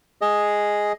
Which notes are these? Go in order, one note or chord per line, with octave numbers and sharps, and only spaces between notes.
G#4 D#5